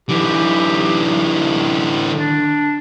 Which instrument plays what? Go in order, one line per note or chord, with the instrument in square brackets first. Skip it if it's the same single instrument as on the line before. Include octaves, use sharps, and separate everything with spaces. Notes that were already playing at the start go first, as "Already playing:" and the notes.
[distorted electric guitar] D3 E3 [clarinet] G4
[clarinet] D4